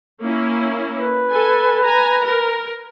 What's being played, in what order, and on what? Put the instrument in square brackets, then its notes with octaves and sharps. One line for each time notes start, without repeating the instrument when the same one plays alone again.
[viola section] A#3 C#4 E4
[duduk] B4
[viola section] A4 G#5
G#5 A#5
A#4